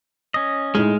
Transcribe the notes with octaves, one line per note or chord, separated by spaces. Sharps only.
C#4 D#5
A2 G#3 D#4 F6